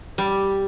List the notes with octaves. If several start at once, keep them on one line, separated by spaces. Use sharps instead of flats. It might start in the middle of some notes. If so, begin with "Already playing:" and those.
G3